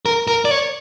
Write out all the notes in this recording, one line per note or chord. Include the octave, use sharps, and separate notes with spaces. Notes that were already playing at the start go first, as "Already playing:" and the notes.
A#4
A#4
D5
C#5